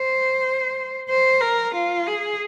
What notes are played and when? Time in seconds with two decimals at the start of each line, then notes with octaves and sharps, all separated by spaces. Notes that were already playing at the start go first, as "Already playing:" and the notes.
Already playing: C5
1.09 C5
1.41 A#4
1.74 F4
2.07 G#4